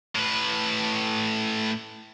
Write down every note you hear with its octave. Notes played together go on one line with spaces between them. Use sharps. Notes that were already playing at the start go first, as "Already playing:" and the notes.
A2 B4